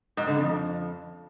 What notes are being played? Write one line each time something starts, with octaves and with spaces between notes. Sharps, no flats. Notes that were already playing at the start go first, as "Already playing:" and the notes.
G#2
D3
F2